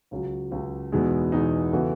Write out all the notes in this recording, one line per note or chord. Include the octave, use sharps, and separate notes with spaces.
C#2 C#3 F#3
C#2 C#3 F#3
E2 B2 G#3 D#4
E2 B2 G#3 D#4
C#3 E3 B3 F#4 A4